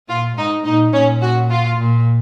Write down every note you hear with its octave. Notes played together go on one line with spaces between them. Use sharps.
A#2 F4
G#2 D#4
A#2 D#4
A#2 C#4
F#4
F4
A#2